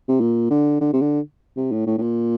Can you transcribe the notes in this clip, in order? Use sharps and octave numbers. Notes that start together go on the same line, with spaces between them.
C3
A#2
D3
D3
C3
D3
C3
A2
A2
A2
A#2